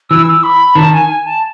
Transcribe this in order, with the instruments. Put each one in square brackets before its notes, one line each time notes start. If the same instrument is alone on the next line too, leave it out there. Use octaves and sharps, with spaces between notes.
[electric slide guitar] E3 [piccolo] E6
[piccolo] E6
B5
[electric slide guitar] D#3 [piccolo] A5
[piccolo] G#5
G#5
A5